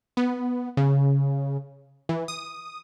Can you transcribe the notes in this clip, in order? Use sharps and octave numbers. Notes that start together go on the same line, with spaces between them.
B3
C#3
E3
D#6